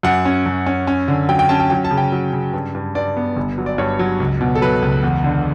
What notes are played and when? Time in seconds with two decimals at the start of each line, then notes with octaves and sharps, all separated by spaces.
0.03 F#2 F#5
0.25 C#4
0.46 F#2
0.66 C#4
0.87 C#4
1.08 D3
1.29 F#3 G5
1.39 G5
1.49 C#4 A5
1.60 G5
1.70 F#3 G5
1.85 A5
1.91 C#3
1.98 G5
2.12 F#3
2.33 C#3
2.53 G2
2.75 G2
2.95 G2 D5
3.17 B3
3.37 G1
3.58 F#3
3.66 D5
3.78 G2 C#5
3.99 F#3
4.20 C#2
4.41 B2
4.55 A4
4.62 F#3 B4
4.82 C#2
5.03 E2
5.24 D3